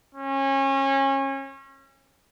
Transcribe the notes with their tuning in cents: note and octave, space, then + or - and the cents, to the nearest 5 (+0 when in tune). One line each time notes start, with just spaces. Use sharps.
C#4 -30